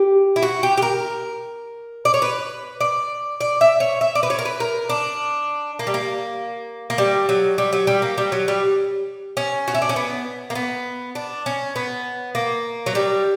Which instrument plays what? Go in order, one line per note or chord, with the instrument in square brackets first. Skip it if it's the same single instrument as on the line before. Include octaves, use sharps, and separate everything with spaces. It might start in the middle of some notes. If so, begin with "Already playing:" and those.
Already playing: [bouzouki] G4
E4
F#4
G4
G4
A#4
D5
C#5
B4
D5
D5
E5
C#5
E5
D5
B4
C#5
A#4
B4
A#4
D4
A#3
G3
A#3
A#3
G3
F#3
G3
F#3
G3
A#3
G3
F#3
G3
C#4
F#4
E4
D4
C#4
B3
A#3
B3
D4
C#4
B3
A#3
F#3
G3